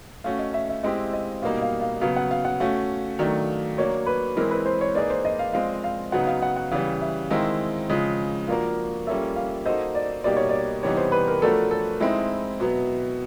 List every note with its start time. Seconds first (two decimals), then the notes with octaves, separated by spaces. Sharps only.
0.24 A3 C#4 F#4 F5
0.39 D#5
0.54 E5
0.69 E5
0.83 G#3 C4 E4 G4 D#5
1.13 D#5
1.42 B2 G3 A#3 D#4 F5
1.62 F5
1.81 F5
2.01 C#3 F#3 B3 F5
2.16 F#5
2.31 F5
2.45 F#5
2.60 A3 C#4 F#4 F5
3.19 D#3 F#3 A3 D4
3.78 F#3 A#3 D4 C#5
4.06 B4
4.37 E3 G#3 C4 E4 A#4
4.51 B4
4.66 C5
4.81 C#5
4.95 A#3 D#4 G#4 B4 D5
5.10 C5
5.25 D#5
5.39 F5
5.53 F3 G#3 C4 F5
5.84 F5
6.12 C#3 F#3 B3 D#4 F#4 F#5
6.27 F5
6.42 F#5
6.56 F#5
6.71 C#3 E3 G3 F5
7.01 E5
7.30 D#3 G#3 C4 E4 F5
7.89 C#3 F3 G#3
8.48 F3 A#3 D4 F#4 A#4 F5
9.07 G3 A#3 C#4 F4 A4 E5
9.36 F5
9.66 A#3 D#4 F#4 A4 C5 D#5
9.95 D5
10.24 B2 G3 A#3 D#4 G4 D5
10.37 C#5
10.49 D5
10.83 C3 E3 G3 B3 D#4 C#5
10.97 C5
11.12 B4
11.27 A#4
11.42 F3 A3 D4 F#4 A4 A#4
11.71 A4
12.00 G#3 C4 D#4 E4
12.60 B2 F#3 B3